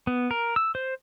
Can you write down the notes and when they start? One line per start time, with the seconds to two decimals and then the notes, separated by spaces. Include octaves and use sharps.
0.07 B3
0.31 A#4
0.56 E6
0.75 C5